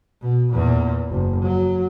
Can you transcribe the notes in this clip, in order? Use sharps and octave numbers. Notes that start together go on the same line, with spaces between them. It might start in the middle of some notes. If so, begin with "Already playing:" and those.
B2
E2 A#2
F#1
F#3